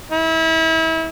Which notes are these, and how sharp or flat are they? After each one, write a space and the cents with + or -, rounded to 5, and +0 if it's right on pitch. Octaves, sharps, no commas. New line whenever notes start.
E4 -30